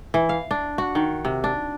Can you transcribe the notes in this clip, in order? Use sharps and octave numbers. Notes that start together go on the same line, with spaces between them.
E3
F5
D4
F#4
D#3
C3
D4